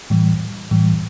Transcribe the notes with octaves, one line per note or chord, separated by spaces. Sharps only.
A2 E3 G3
A2 E3 G3